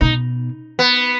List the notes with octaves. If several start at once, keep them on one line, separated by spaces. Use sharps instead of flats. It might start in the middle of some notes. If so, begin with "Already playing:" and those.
B2 D#4
B3